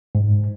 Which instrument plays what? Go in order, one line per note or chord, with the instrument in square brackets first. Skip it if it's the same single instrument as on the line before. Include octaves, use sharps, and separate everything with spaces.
[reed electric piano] G#2